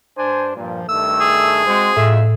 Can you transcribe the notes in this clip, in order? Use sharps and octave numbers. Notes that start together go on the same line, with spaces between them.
G2 D4 C5 G#5
G2 A#2 F3
G2 D#3 A3 E6
G#4
G#3 C4 F#4 C5
F2 A2 G#3 E5